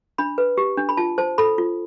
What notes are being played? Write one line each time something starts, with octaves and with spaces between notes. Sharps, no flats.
D4 B5
B4
G4
D4
B5
F4 A5
C5 A5
A4 B5
F4